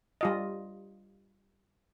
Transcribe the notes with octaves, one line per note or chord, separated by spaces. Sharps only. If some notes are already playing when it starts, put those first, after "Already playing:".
G3 F4 D#5